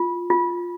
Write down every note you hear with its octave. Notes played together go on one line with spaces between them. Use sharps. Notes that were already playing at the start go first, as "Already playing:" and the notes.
Already playing: F4
F4